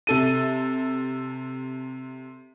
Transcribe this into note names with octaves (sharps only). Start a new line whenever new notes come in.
C3 A4 D#7